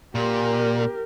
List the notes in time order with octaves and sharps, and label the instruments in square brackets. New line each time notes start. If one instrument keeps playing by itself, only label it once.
[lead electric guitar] A#2 [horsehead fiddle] G4 A#4